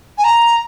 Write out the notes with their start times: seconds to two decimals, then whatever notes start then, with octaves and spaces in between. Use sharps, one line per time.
0.18 G#5
0.24 A#5